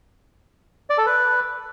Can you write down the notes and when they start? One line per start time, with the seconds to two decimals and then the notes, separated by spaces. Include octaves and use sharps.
0.90 D5
0.98 A4
1.06 B4